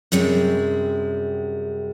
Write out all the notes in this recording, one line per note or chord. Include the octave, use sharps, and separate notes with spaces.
F#2 C3 G3 G#3